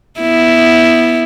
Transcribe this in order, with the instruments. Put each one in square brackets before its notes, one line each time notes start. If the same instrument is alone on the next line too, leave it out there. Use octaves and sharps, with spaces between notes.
[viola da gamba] B3 E4